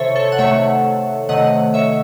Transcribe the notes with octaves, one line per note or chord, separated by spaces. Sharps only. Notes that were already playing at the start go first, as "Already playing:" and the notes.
Already playing: C3 D#3 A4 C5 C#5 E5
A4 C#5
F#5
C3 D#3 A3 C#5 E5
C3 D#3 A3 D#5 F#5
C#5 E5